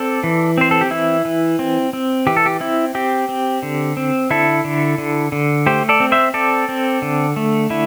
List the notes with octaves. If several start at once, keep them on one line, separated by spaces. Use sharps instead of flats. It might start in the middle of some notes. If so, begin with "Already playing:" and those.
Already playing: C4 A4 D5
E3
C4 C5
A4
G4
E3 E4
E3
C4
C4
E3 G4
A4
G4
C4 E4
C4 G4
C4
D3
C4
D3 E4 A4
D3
D3
D3
A3 G4 C5
A4 D5
C4
C5 E5
C4 A4 D5
C4
D3
A3
D3 E4